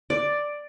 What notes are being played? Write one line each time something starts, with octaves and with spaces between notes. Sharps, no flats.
D5